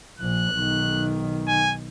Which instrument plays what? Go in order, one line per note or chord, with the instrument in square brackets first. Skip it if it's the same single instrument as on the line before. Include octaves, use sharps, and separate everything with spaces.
[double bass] A#1 [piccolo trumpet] F#6
[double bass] B1 D#3
[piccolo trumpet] G#5